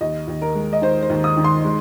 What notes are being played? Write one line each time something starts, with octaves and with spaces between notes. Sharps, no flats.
D#2 D#5
D#2
A#4
G#3
D#5
D#3 C5
C5
D#2
D#6
D#3
C6
G#3